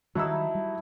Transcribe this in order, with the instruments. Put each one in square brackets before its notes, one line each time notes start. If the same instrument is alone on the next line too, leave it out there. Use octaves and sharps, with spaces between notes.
[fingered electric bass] D#3 G3 [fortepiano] F#3 E6 [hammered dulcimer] D#4 E4 A4
[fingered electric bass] G3